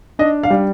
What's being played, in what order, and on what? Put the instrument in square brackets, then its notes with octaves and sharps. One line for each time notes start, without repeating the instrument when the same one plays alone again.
[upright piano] D4 D#5
F5
G3